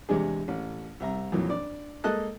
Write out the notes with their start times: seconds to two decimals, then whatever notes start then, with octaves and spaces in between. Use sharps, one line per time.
0.09 E2 C3 G#3 D4 G#4
0.48 A1
1.00 C2 E5 A#5
1.32 F2 A#2 E3 F#3
1.50 D4 D5
2.04 G#3 A#3 A4 D#5 A5 F#6